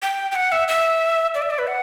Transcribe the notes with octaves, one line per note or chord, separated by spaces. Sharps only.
G5
G5
F#5
E5
E5
D5
E5
D5
B4
F#5